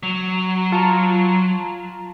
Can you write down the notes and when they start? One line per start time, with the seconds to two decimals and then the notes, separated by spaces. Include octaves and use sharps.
0.03 F#3
0.72 F4 A5 A#5